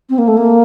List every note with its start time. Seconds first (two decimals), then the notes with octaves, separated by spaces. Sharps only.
0.10 C4
0.18 A#3
0.28 A3
0.37 A#3